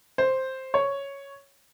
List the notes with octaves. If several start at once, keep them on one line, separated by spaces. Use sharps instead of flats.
C5
C#5